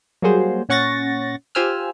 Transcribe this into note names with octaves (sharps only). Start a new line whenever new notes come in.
F#3 G3 A#3 F#4 G#4 C5
A#2 C#4 F#5 C#6 A6 A#6
F4 G4 C5 G#5 E6 F6